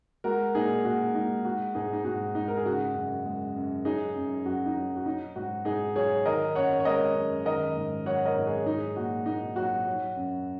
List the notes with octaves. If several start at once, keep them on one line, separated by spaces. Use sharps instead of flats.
G#3 F#4 A#4
A#2 D#4 G#4
A#2 F#4
G#3 D#4
G#3 F#4
G#2 D#4 G#4
D#4
G#2 F#4
G#3 D#4
A#4
G#4
C#3 F#4
F#2
G#3
F#2
F#3 D#4 G#4
F#2
F#2 F#4
D#4
F#3
F#4
F#3 D#4
G#2 F#4
G#2 D#4 G#4
F#3 G#4 C#5
D#3 A#4 D#5
F#2 C#5 F#5
C#5
G#3 A#4 D#5
F#2
D#3 A#4 D#5
G#2
F#3 C#5 F#5
A#4 D#5
G#2
G#4 C#5
F#3 D#4 G#4
A#2 F#4
A#2 D#4
F#3 F#4
F#3
F#2